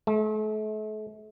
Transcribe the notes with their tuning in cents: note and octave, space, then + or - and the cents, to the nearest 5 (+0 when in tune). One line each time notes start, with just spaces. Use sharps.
A3 -40